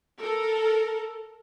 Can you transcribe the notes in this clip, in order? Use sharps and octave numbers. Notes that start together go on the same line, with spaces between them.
A4 A#4